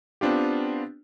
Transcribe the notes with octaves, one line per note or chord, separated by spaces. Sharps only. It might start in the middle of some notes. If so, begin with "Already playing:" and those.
B3 C4 D4 F4 G4